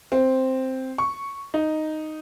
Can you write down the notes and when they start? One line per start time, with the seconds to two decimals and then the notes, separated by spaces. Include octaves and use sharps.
0.12 C4
0.98 C#6
1.54 D#4